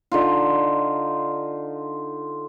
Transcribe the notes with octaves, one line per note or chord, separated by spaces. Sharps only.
D3 D#4 F4